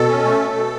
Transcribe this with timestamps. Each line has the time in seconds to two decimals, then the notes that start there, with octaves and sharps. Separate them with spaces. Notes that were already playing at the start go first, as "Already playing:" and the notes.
Already playing: B2 A4
0.09 C#4
0.24 A3
0.40 B2
0.56 B2